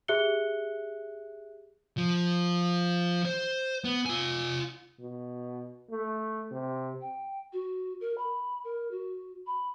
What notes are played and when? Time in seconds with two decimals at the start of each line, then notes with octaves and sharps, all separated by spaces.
0.08 G4 G#4 E5 F#6 C#7 G7
1.98 F3
3.25 C5
3.85 B3
4.06 F4 G#5
5.00 B2
5.90 A3
6.51 C3
7.01 G5
7.53 F#4
8.01 A#4
8.18 B5
8.64 A#4
8.91 F#4
9.47 B5